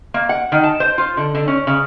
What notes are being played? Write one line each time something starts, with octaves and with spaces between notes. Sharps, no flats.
A#3
F#5
D#3
A5
C5
F4
D3
D3
C#4
C#3